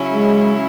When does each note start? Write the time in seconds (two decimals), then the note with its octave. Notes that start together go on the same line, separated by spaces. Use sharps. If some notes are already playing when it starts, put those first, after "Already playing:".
Already playing: C#3 F#3 C#4 E4
0.12 G#3